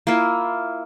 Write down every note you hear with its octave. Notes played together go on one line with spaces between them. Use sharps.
A#3 E4 F4 E5